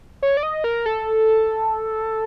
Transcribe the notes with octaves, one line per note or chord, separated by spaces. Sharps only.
C#5
D5
D#5
A#4
A4